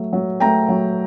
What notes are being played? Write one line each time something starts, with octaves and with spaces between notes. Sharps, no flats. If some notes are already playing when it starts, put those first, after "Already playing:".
Already playing: F#3 A3
F#3
A3 G5 A#5
F#3